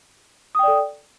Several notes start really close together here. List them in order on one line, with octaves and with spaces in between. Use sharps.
D#6 G5 D5 A4